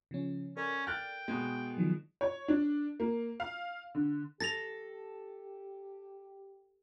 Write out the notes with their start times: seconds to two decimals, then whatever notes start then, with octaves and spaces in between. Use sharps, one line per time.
0.11 C#3 F3 C#4
0.57 C#4 A4 A#4 D5
0.87 G5 F6 F#6 A6
1.28 B2 G#3
1.77 D#3 F3 F#3
2.21 C#5
2.48 D4
3.00 A#3
3.40 F5
3.95 D3
4.40 G4 A4 A6 A#6 F7